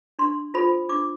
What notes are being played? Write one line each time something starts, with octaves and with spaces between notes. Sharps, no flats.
D4 C6
F4 A4 C5 B5
D4 D6